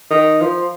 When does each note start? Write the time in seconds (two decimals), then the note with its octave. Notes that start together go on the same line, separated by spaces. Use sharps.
0.10 D#3
0.41 F3